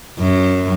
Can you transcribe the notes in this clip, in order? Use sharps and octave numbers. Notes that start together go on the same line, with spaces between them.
F#2